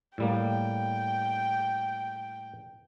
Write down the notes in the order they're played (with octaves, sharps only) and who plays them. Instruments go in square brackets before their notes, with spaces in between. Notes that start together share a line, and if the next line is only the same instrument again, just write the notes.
[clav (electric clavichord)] A2 G3 A#3 [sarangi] G5